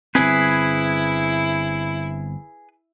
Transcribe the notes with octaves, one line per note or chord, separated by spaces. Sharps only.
G1 C4 E4 G#4 B4